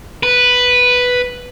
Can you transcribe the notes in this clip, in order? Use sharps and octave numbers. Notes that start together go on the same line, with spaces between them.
B4